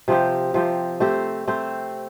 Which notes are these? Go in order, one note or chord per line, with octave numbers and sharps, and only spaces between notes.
C3 F3 C4 G4
C3 F3 C4 G4
A3 C4 G4 C5
A3 C4 G4 C5